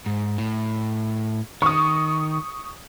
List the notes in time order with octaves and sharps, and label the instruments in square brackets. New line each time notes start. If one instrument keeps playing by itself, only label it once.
[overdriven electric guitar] G#2
A2
[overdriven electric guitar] D#3 [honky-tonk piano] C#6 D#6